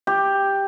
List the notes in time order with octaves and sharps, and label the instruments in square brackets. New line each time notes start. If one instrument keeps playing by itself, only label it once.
[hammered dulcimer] G4